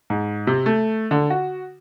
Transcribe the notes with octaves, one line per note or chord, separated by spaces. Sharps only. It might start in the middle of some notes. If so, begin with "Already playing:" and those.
G#2
C3
A3
D3
F#4